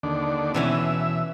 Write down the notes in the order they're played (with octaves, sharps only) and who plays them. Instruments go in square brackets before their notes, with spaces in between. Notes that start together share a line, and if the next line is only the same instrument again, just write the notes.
[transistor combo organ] D#2 D3 D4
[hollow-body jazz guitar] B2 E3 C#4 [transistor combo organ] E5